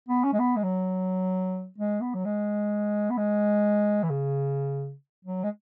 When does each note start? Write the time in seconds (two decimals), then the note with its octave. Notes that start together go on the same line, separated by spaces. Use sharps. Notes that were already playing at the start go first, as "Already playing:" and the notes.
0.09 B3
0.24 C#4
0.33 G#3
0.39 B3
0.56 G#3
0.63 F#3
1.78 G#3
2.01 B3
2.14 F#3
2.25 G#3
3.10 B3
3.18 G#3
4.03 E3
4.10 C#3
5.25 F#3
5.43 G#3